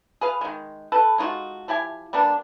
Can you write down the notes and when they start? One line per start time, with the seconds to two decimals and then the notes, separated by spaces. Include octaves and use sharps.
0.21 G#4 B4 F5
0.41 D#3 G#3
0.92 A4 B4
1.18 G#3 D#4 F4 F#4
1.68 F3 E4 G4 G#5
2.13 G3 A#3 B3 D4